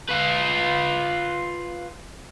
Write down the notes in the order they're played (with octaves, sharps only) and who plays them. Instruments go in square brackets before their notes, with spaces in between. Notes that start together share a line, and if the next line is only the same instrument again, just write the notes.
[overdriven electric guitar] F4 B4